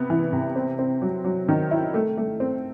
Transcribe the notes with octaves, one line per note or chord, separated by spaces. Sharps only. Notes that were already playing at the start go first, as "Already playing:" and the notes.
Already playing: C3 B3
E3
C3
C4
C4
F#3
F#3
D#3
E4
A3
A3
C4